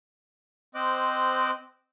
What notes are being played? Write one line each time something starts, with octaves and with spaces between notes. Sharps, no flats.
C4 C5 D#5 D6 F#6